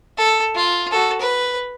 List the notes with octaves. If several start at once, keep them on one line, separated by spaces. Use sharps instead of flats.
A4
F4
F#4 A4
B4